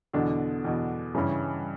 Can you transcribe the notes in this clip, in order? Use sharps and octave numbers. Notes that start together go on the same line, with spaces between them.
E2 B2 D3 D4
E2 B2
G2 C#3 E3 C#4